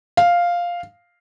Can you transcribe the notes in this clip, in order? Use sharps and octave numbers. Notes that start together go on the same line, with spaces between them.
F5